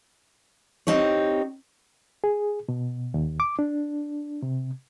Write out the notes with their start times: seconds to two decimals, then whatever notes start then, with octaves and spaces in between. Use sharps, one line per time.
0.87 C4 D#4 G4 C#5
2.24 G#4
2.69 B2
3.14 D#2
3.40 D6
3.59 D4
4.42 C3